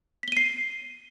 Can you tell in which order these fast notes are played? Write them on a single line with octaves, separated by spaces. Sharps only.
B6 G7 D#7 C7